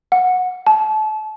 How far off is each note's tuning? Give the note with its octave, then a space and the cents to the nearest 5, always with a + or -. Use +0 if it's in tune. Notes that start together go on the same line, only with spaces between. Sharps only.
F#5 -15
A5 -30